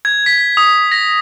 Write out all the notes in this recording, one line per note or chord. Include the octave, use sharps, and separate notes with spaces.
G#6
B6
D#6
A#6